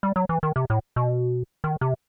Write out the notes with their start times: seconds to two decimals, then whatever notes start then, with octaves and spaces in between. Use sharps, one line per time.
0.03 G3
0.16 F#3
0.29 E3
0.43 D#3
0.56 C3
0.70 A2
0.96 B2
1.64 D#3
1.81 C3